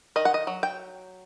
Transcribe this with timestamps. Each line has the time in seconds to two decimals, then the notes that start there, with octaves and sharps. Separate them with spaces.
0.16 D#3 D#5
0.25 F#5
0.34 D#5
0.47 F#3
0.63 G5